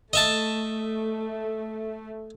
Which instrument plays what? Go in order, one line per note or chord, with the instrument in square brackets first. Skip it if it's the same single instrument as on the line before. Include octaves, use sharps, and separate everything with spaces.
[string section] A3 [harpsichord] D#5 E5 A5